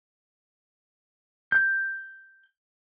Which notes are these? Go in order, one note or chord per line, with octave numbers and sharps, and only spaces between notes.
G6